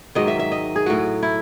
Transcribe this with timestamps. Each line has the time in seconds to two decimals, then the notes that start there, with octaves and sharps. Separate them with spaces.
0.15 G#2 D#3 F#3 D#5
0.28 E5
0.39 E5
0.52 D#5
0.76 G#4
0.86 A2 F#3 F#4
1.23 E4